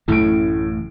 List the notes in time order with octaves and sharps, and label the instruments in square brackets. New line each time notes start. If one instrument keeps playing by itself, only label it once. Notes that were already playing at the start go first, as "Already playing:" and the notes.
[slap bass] A1 F#2 C#3 [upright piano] A2 D7